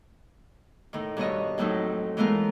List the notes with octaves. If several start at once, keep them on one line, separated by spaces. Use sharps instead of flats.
A2 D#3
G2 B2 C#5 D#5
F2 A2 F#3 A3 D#4
E3 G#3 A3 B3 F4 A#4